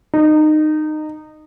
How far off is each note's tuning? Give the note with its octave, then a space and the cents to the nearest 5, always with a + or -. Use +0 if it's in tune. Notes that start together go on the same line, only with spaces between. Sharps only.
D#4 -20